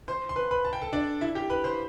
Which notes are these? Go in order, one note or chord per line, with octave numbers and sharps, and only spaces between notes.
C5 C6
C6
B4 B5
B4 B5
A5
G5
A4 A5
D4 D5
E4 E5
G4 G5
B4 B5
C5 C6